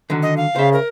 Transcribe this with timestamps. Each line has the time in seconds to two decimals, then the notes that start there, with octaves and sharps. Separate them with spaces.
0.10 D3 D#3 F#3
0.22 D#5
0.37 F5
0.56 C#3 C5 E5
0.73 A#4